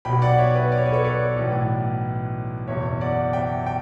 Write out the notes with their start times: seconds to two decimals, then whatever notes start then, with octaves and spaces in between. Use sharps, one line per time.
0.05 B1 B2 G5 B5
0.22 D5 F#5
0.38 C#5 E5
0.54 B4 D5
0.72 D5
0.78 C#5
0.86 B4
0.92 A4 C#5
1.04 B4 D5
1.36 B1 A2 E3
2.68 F#1 E2 B2 C#5 E5
3.01 D5 F#5
3.33 E5 G5
3.66 G5